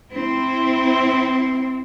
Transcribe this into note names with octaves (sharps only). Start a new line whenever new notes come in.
C4 E4